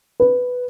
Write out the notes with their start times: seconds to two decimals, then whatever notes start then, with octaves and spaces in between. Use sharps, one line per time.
0.20 B4